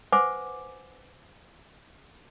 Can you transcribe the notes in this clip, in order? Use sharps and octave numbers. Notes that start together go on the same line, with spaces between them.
B4 C5 E5 F#5 G#5 D6